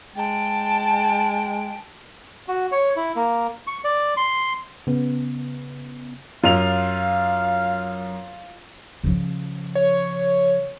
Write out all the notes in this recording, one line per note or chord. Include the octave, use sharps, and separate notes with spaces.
G#3 G5 A5
F#4
C#5
E4
A#3
C#6
D5
C6
C#3 B3
F#2 F4 F5 F7
C#3 F3
C#5